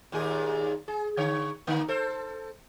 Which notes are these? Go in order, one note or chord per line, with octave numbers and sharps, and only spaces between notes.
D#2 A#2 G#4
G#4
D3 C#5
D3 A#3 D#4
A4 C5